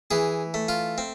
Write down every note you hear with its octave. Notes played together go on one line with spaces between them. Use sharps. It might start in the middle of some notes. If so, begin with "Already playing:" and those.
E3 G#4
A3
F4
C4